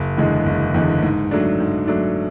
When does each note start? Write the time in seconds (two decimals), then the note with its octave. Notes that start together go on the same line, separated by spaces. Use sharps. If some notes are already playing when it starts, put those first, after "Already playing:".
Already playing: F#1
0.17 E2 D3 G#3
0.46 F#1
0.74 E2 D3 G#3
1.03 G#2
1.31 F#3 A3 D4
1.60 G#2
1.88 F#3 A3 D4